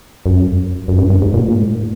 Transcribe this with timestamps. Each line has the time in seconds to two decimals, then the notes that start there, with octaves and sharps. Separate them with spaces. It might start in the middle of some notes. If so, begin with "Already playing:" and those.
0.26 F#2
0.88 F#2
0.98 G2
1.10 G2
1.22 G#2
1.34 A#2
1.44 A2
1.54 G#2
1.65 A2